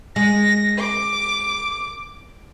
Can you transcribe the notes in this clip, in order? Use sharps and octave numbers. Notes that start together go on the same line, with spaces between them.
G#3 A#6
D6